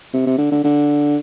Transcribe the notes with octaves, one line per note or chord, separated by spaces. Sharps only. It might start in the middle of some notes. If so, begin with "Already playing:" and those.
C3
C3
D3
D3
D3